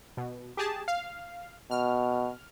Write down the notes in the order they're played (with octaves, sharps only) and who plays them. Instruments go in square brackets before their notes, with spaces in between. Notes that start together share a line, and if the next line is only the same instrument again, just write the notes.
[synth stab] B2
G4 G#4 A5
F5
[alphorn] B2 [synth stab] F6